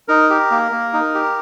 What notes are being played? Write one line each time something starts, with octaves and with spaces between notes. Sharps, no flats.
D#4 A#4
G4
A#3
A#3
D#4
G4